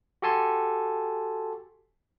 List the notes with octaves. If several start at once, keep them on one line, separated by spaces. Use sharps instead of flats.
F#4 G4 A4 G#5 A5 C6